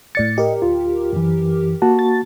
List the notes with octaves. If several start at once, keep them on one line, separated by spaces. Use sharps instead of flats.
A2 D5 A6 C#7
G4 A#4 D#5
D2 F4
F#2 E3
A#3 F#4 A5
A6